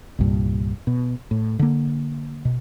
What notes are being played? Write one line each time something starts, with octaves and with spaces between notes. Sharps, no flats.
C2 G2 A#2
B2
A2
D3 A#3
B2